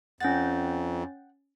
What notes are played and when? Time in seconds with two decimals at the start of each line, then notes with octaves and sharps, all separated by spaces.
0.20 F2 C#4 F#5 G5 A6